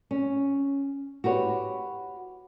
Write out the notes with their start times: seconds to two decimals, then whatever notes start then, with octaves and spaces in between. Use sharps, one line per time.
0.11 C#4
1.24 F#4 G4 B4 C#5